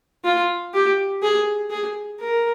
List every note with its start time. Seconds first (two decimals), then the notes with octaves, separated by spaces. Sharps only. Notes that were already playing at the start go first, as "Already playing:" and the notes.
0.25 F4
0.73 G4
1.22 G#4
1.71 G#4
2.20 A#4